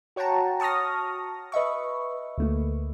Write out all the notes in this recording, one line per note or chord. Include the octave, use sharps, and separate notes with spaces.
F#4 C#5 F#5 G5 A5 A#5
A5 C#6 D#6 F6 A#6
B4 D#5 E5 C#6
D2 A3 A#3